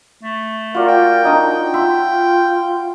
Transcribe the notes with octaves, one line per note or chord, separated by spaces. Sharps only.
A3
F4 F#4 A#4 D5
G5
D4 D#4 D#6
F4 E5 B5 C6